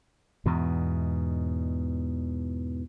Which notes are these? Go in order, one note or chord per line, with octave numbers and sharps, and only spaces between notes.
E2 G#2 B2